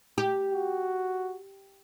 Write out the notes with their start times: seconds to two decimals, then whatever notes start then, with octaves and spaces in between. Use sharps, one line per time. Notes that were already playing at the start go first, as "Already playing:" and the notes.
0.18 G4
0.52 F#4